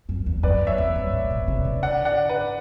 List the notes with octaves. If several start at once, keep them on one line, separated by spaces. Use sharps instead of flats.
F#2
E2
F#2 B4 D5
E2
C#5 E5
E2
G2
A2
B2
C#3
D3
D5 F#5
D5 F#5
B4 D5